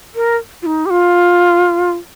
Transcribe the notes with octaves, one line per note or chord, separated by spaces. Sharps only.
A#4
F4
D#4
G4
F4